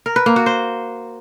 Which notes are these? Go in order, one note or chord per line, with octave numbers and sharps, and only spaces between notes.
A#4
B4
A#3
F#4
C5